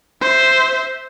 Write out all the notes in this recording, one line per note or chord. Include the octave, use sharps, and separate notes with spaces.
C5 E5